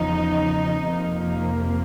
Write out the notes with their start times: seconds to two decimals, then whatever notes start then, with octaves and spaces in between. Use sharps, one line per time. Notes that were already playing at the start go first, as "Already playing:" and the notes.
Already playing: E2 C#3 F3 D#4
0.88 F2 C3 F3 A#3